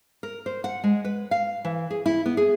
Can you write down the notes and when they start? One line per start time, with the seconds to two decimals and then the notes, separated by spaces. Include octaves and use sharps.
0.23 A#4
0.46 C5
0.64 F#5
0.84 G#3
1.05 B4
1.31 F5
1.65 E3
1.90 G#4
2.06 E4
2.26 B3
2.37 G#4